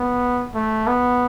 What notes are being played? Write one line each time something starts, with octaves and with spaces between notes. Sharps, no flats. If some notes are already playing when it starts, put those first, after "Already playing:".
Already playing: B3
A3
B3